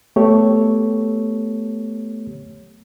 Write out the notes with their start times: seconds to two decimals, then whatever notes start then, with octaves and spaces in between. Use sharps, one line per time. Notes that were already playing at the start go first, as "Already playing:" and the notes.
0.16 A3 B3 G4 A4 C#5